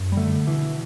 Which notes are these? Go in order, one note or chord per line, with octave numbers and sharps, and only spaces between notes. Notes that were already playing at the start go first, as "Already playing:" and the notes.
Already playing: F#2
G3
D3 A3
B2 E3